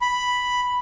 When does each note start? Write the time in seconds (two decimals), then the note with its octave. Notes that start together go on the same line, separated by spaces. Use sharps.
0.01 B5